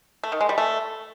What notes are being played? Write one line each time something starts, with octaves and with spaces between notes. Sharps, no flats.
A3
D#3
G#3
G3
A3